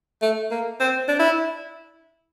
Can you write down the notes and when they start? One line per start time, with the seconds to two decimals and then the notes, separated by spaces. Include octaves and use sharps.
0.22 A3
0.51 A#3
0.80 C4
1.08 D4
1.20 E4